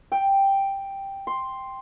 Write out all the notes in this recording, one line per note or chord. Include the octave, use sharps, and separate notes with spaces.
G5
C6